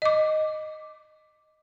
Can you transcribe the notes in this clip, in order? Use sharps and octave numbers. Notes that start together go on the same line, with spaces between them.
D#5 D6